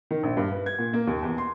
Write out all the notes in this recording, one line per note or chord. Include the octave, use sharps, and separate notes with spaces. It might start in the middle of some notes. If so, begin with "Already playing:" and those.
D#3
A#1
G2
B4
G#6
A#2
A#3
D#2
E2
C6